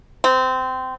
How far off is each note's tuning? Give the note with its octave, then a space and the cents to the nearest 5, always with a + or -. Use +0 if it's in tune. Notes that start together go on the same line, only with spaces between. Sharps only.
C4 -20